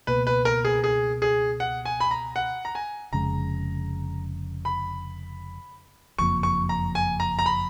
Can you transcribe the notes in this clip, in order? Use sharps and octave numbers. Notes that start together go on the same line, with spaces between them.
C#2 B2 A#3 B4
B4
A#4
G#4
G#4
G#4
F#5
G#5
B5
A#5
F#5
A#5
G#5
F1 F2 C#3 G#3 A#5
B5
F#1 F2 F3 A#3 C#6
C#6
A#5
G#5
A#5
A#5
B5